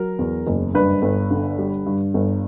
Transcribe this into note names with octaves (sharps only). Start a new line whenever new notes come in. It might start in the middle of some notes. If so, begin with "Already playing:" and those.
Already playing: F#3 A#4
E2
F#1
G2 B4
G1
D3
G3
G2
G1